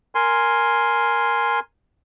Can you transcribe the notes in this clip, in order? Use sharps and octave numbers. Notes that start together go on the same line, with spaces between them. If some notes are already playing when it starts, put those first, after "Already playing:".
A#4 G#5 C6